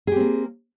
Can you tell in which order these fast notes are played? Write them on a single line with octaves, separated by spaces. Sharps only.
G#4 G4 C4 A#3